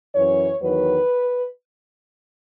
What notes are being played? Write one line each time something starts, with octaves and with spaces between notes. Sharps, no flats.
F#2 E3 C#5
E2 D#3 F#3 B4